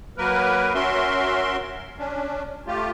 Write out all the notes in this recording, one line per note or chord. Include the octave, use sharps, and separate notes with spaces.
F#3 A#3 A#4 B4
C#4 F#4 A#4 E5 C6
C#4 D4
A3 F4 G4